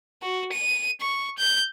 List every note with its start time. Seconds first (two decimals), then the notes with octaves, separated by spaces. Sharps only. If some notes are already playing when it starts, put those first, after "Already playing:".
0.23 F#4
0.52 D#7
1.01 C#6
1.38 G6